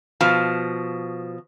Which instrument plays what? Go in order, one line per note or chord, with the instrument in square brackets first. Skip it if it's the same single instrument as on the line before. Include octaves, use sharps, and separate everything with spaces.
[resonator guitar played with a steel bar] B2 F3